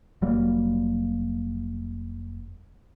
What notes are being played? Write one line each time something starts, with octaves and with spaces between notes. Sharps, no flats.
F1 F#3 G3 A#3